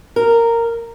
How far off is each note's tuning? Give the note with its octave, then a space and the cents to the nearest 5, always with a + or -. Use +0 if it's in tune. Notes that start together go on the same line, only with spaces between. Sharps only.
A#4 -10